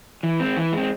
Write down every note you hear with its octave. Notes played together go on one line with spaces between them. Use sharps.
E3
G#3 C4
E3
G#3 C4